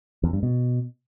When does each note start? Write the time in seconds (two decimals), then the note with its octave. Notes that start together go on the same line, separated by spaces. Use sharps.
0.23 E2
0.33 G2
0.43 B2